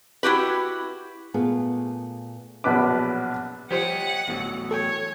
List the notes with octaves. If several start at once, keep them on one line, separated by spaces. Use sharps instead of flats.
E4 F#4 G4 B4
A#2 A3 B3 F4 G#4
A#1 F#2 B2 B4 D6
F3 G3 G4 C5 C#5 D#5 F#5
G1 E2 A2 F#3
A4 C#5 G5 G#5